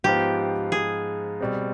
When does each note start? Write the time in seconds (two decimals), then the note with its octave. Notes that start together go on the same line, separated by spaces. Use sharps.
0.04 G#2 F3 B3 F4 G4 C5
0.72 G#4
1.41 B2 G3 C4